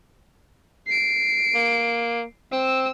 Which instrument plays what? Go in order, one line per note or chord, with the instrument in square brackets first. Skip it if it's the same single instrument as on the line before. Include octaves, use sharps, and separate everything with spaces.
[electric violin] C7 D7
[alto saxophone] A#3
[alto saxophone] C4 [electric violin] E6